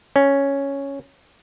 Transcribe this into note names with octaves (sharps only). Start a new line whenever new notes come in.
C#4